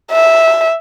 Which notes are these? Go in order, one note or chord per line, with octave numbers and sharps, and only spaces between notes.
E5